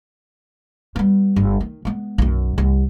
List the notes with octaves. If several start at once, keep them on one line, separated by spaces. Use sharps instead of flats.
G3 B3
G1
D#3
G#3 B3
B1 F#2
C2